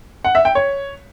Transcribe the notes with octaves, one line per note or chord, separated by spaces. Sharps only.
F#5
E5
G5
C#5